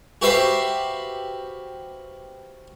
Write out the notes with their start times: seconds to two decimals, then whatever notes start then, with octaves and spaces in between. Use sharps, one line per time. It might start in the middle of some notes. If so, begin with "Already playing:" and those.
0.22 F#4 G4 B4 C5 E5 F5